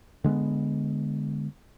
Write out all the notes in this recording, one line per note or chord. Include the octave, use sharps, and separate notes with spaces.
D3 G#3 A#3 B3